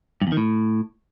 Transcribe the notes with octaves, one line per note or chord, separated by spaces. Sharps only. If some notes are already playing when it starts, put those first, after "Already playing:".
G2
E2
D#3
A2